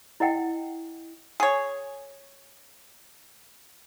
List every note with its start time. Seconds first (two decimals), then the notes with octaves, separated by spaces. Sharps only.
0.20 E4 D#5 F#5 G5
1.40 G#4 C#5